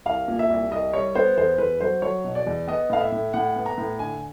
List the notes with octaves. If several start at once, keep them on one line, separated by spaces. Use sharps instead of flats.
C2 F5
A#2
E5
C2
C2 D#5
G3 C#5
B3 C5
E2 C5
E2 B4
F#3 C5
F#3 C#5
B2
D5
E2
B3 D#5
A2 F5
E5
A2
A2 F#5
B3
A#5
A2
D3 G#5